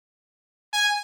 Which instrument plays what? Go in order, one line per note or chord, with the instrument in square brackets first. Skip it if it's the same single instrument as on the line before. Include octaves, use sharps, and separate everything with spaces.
[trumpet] G#5